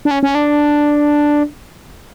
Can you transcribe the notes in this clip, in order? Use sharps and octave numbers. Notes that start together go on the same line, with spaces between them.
D4
C#4
C#4
D4